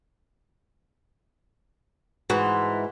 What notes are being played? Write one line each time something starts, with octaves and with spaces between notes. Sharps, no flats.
G#2 E3 F#4